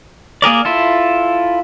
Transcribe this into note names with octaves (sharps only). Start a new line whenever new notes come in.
A#3 G#4 A#4 D5
E4 F4 A4